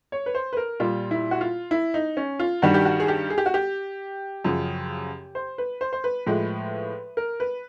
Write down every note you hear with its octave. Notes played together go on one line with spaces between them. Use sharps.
C#5
B4
C5
B4
A#4
A#2 G3 F4
E4
F#4
F4
E4
D#4
C#4
F4
G2 D#3 G3 F#4
G4
F#4
G#4
G4
G#4
G4
F#4
G4
F#2 C#3 F3
C5
B4
C5
C5
B4
A2 F3 G#3
A#4
B4